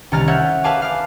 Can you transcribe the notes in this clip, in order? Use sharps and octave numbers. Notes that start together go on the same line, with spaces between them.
C2 D#3 C#4 A#5 F6 A6
A#4 C#5 E5 F#5 G6
B4 E5 F5 G#5 A5 D6
F5 D6